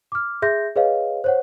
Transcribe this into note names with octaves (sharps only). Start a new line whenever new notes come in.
D6 F6
G#4 E5 C6 G6 A#6
G#4 B4 C#5 D#5 F5
C5 C#5 F#5